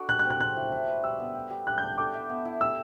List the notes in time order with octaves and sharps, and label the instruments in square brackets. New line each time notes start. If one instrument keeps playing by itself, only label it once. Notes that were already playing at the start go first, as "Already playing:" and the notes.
Already playing: [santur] D4 F#4 A4 D5
[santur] G4 [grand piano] F#6
[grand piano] F#6
[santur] C4
[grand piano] F#6
[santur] C4 [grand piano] F#6
[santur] E4
E4
B4
[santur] G3 [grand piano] E6
[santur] B3
G4
G3
[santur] G3 [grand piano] F#6
[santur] D4 [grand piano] G6
[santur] A4 [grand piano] D6
[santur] E5
B3
E4
[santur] G4 [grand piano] E6